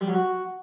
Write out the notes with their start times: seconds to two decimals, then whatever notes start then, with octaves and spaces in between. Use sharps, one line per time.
0.01 G3
0.07 F#3
0.13 F#4